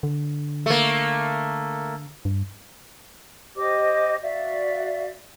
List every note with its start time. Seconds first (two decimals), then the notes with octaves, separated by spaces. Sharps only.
0.03 D3
0.66 A3 A#3
2.25 G2
3.56 G4 C5 D#5 D6
4.23 F#4 D5 E5 F5